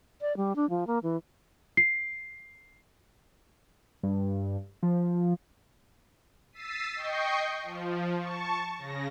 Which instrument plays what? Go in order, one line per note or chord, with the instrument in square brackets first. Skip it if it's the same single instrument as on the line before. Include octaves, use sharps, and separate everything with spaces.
[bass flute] D5
G3
D4
F3
A#3
E3
[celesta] C7
[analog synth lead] G2
F3
[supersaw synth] E6 A6 B6 C7 D#7
D#5 G5 C#6 G6 C7
F3
A5 C#6
C#3 A#6